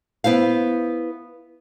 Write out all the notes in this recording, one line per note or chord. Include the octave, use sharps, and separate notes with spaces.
B3 E4 C5 F5